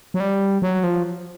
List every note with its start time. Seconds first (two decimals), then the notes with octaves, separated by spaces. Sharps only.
0.14 F#3
0.20 G3
0.62 F#3
0.84 F3